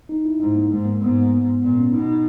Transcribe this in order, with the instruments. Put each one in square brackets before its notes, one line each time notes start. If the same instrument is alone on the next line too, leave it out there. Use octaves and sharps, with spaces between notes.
[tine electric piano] D#4
E4
[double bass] G#2 [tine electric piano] D#4
[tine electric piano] A#3
[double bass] G#2 [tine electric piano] G#3
[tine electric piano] A#3
[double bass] G#2 [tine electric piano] B3
[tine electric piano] B3
[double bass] A#2 [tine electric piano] B3
[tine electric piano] C#4
[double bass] B2 [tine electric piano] D#4
[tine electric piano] D#4